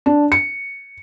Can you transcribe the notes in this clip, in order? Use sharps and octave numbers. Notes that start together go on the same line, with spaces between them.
D4
C#7